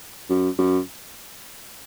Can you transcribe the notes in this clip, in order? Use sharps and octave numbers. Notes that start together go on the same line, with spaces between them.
F#2
F#2